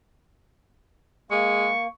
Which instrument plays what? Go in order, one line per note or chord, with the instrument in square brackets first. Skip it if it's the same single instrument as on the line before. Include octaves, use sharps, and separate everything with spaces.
[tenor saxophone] G#3 [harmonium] A#3 [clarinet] C#6